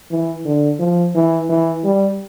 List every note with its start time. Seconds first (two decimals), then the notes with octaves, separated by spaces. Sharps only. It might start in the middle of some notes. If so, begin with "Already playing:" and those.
0.11 E3
0.45 D3
0.79 F3
1.15 E3
1.49 E3
1.84 G3